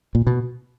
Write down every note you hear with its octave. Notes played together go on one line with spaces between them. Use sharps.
A#2
B2